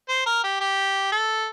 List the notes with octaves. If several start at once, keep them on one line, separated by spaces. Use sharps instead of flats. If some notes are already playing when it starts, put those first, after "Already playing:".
C5
A#4
G4
G4
A4